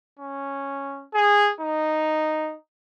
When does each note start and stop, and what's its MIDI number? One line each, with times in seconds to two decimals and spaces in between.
0.19 1.04 61
1.14 1.52 68
1.60 2.55 63